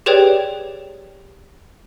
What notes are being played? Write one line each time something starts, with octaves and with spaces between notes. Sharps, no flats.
G4 G#4 B4 C#5 D5 G5